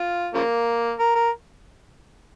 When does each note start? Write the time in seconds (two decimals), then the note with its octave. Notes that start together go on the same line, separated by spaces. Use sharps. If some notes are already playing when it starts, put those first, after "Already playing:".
Already playing: F4
0.34 C#3 F3 A#3
0.99 A#4
1.15 A#4